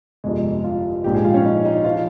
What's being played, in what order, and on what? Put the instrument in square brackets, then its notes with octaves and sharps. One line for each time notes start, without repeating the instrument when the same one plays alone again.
[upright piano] G1 F2 C3 G#3
F4
A#1 G#2 F3 G4
G#4
F4
C#4
D#4
D#4
F3 F4